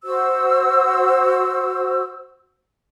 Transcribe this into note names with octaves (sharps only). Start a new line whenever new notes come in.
F#4 C5 E6